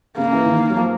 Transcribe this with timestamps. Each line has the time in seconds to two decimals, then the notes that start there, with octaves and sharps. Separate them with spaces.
0.18 C#3 A#3
0.32 E3
0.46 D#3
0.70 F#3
0.77 F3